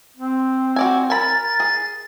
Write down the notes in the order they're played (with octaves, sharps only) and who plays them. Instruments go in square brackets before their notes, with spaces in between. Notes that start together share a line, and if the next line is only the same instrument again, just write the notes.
[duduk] C4
[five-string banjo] F#4 D5 G#5
[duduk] A#4 [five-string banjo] G#5 B5 [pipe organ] A6
[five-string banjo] G#4